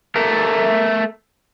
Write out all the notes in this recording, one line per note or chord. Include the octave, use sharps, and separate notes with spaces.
A3 A#4